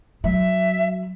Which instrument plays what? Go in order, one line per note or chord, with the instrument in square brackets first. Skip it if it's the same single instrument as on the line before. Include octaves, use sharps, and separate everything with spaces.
[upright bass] F#3 [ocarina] E5